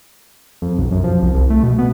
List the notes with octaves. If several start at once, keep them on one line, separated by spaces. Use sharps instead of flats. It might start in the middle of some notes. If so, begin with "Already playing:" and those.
F2
B1
F#2
F3
C2
C2
A3
B2
B3